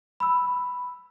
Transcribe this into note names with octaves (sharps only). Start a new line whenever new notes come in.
B5 E6